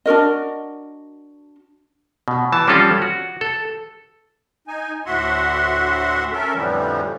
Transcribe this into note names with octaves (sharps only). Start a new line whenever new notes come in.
D4 F#4 A#4 D#5
B2
E3 A5
F3 G3 C4 C#4 F4 A4
F#4
A4
D#4 G#5
D2 A2 F#4 E5 F#5 C6
C#4 A4 A#4 E5
F2 A2 D3 E3 F3 G3